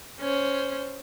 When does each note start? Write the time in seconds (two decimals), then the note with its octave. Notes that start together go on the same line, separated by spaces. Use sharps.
0.20 C#4 C5